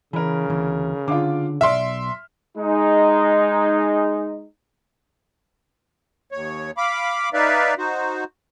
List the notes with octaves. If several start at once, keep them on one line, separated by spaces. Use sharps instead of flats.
C#3 E3 A#4 B5
D2 E3
D3 F4 F5 D6
B1 D5 E5 C6 F6
G#3 D#4
D#2 C#5
F5 B5 D6
D#4 B4 D5 E5 F5
D#4 F#4 C5